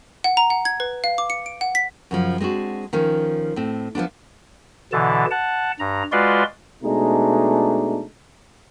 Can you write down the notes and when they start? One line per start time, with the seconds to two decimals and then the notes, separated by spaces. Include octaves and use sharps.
0.24 F#5
0.37 A#5
0.50 F#5
0.65 G#6
0.80 B4
1.04 F5
1.18 D6
1.30 C#7
1.46 D7
1.61 F#5
1.75 B6
2.11 F#2 C#3 F3
2.40 G#3 C4 D4 F#4
2.93 D#3 F3 C#4
3.56 A2 C4
3.95 F3 A3 B3 D4
4.92 B2 D3 E3 A5
5.31 F#5 A5
5.80 G2 A#5
6.12 G#3 F4 F#4 B4 D5 C6
6.83 B2 G#3 A3 D4 D#4